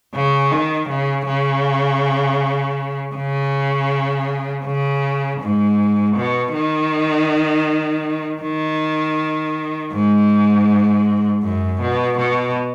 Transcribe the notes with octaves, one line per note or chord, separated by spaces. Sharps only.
C#3
D#3
C#3
C#3
C#3
C#3
G#2
B2
D#3
D#3
G#2
F#2
B2
B2